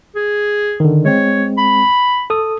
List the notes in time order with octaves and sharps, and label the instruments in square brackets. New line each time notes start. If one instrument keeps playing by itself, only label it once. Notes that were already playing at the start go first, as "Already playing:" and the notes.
[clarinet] G#4
[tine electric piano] D3 D#3
[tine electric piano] G#3 C4 [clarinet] C#5
[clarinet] B5
[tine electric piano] A4 D#6